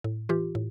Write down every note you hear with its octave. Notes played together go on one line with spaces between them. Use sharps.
A2
E3 F4 G4
A2